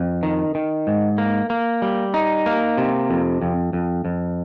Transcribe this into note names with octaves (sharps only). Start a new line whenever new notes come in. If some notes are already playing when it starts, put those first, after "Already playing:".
Already playing: F2
D#3
D#3
G#2
A#3
A#3
G3
D#4
A#3
C3
F2
F2
F2
F2